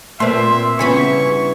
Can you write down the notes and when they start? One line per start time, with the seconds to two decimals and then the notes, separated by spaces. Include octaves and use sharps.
0.20 A#2 A3 C4 B4 E5 C6
0.79 G2 C#3 E3 B3 C#4 C#5 B5 C#6